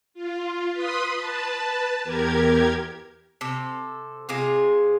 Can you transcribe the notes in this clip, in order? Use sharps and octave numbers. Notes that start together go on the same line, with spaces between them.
F4
B4 B5 C6 D#6
B4 A5
E2 G4 A#4 G#6
C3 A4
C3 G#3 F4 G#4